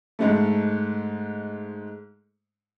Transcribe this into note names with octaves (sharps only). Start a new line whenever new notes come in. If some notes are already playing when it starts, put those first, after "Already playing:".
G#2 G#3 A3